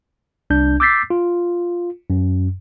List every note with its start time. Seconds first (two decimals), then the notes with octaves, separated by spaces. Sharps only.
0.50 C2 D4 G6
0.80 D6 E6 G6 A6 B6 C7
1.10 F4
2.10 F#2